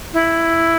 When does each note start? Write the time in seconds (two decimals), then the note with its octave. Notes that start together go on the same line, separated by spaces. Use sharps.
0.13 E4